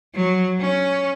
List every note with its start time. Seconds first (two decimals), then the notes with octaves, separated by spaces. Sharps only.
0.15 F#3
0.60 C#4